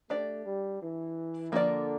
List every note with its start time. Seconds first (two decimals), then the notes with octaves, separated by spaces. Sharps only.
0.10 A3 D4 G4 D5
0.46 G3
0.81 E3
1.52 D3 F3 A#3 E4 A#4 D5